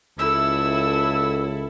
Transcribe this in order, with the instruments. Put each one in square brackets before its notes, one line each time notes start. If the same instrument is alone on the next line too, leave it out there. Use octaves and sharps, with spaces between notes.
[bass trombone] C#2 [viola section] E4 A4 [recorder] E6